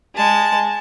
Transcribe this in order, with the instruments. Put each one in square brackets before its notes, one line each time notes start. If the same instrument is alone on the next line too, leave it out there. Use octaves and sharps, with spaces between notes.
[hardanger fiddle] G#3 A5